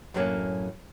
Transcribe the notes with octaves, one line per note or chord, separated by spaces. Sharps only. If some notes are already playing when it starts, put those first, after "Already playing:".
F#2 A2 F#3 A#3 C#4